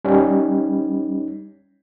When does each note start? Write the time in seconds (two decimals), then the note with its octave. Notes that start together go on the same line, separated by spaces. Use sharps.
0.05 G3 C#4 D#4